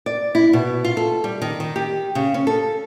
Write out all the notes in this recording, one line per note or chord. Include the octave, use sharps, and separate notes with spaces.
D5
E4
B2
F4
A4
G3
D#3
D#3
G4
C#3
C#4
A4